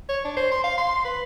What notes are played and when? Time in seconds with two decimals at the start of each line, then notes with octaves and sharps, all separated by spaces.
0.09 C#5
0.25 D4
0.37 C5
0.52 C6
0.64 F5
0.78 C6
1.05 B4